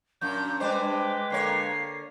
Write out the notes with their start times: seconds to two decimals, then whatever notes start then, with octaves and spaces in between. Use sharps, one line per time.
0.21 F#2 A#2 D4 G6
0.60 G3 G#3 D4 B4 C5 G5 D6
1.30 D3 A#3 C#5 C7